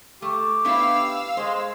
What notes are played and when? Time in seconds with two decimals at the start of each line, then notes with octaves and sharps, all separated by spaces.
0.22 A3 G4
0.65 B3 D4 E4 F5 E6
1.37 G#3 C5